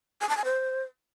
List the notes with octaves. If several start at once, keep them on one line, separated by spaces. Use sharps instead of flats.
G#5
A5
G#5
C5